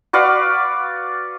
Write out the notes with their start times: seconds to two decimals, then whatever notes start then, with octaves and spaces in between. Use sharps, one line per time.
0.13 F#4 B4 D5 F5